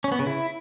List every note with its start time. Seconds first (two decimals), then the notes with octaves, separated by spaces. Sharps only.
0.04 C#4
0.12 B3
0.19 C#3
0.27 E4